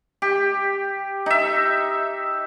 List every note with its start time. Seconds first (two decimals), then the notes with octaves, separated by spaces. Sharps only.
0.22 G4
1.26 D#4 E5